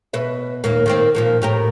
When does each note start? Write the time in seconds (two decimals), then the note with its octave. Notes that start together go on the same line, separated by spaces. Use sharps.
0.13 B2 B4 E5
0.64 D#2 A#2 A#3
0.86 D#3 A#3 C4
1.15 A#2 F3 A#3
1.42 A2 G4 A#4